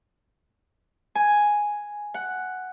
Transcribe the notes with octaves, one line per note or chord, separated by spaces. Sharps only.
G#5
F#5